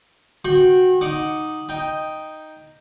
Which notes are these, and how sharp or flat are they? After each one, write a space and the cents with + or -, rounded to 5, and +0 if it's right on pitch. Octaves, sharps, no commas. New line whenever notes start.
F#4 -5 G5 +0 C#6 -40
D#4 +0 F#5 +0 D6 +0
D#4 +0 G5 +0